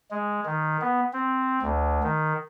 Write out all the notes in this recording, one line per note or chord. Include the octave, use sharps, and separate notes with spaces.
G#3
D#3
B3
C4
D2
D#3